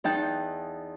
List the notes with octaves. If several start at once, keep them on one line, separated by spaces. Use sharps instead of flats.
E2 D#4 G5 A5 F#6